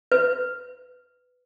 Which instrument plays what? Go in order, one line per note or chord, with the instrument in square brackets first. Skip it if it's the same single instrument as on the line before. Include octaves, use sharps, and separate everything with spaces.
[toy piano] B4